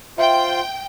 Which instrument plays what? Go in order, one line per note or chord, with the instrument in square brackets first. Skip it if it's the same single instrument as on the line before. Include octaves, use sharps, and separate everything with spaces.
[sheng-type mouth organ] F4 C5 [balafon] E5 [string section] G5